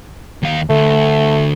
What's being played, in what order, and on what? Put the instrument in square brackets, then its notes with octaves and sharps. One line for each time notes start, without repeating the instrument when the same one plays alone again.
[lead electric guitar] D#2 F5
[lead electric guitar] D2 [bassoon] A3